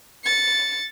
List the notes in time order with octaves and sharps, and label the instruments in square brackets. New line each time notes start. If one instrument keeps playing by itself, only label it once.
[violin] A6 C#7